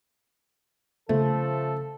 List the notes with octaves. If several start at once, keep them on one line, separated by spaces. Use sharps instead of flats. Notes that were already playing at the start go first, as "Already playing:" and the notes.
C#3 F3 A3 A4